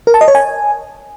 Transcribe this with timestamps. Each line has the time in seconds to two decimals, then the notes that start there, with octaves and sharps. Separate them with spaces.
0.07 A#4
0.14 A5
0.21 D#5
0.28 C#5
0.35 G#5